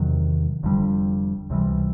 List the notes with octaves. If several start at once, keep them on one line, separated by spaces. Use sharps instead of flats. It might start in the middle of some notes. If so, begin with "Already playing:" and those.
Already playing: E2 C3 D#3 F#3
F1 F2 D3 G3
C#2 C3 E3 G3